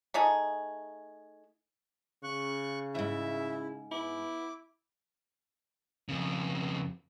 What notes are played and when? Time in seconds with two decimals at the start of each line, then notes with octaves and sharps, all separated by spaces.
0.14 A3 D#4 G#4
2.23 C#3 C#6 F#6
2.95 D#2 G#2 E4 E5
3.92 B3 E4 D6
6.09 F2 C#3